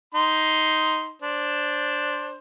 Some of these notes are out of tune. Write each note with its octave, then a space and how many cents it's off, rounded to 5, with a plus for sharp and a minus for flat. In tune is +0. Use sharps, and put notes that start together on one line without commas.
D#4 +10 C6 -5
D4 +0 C5 +15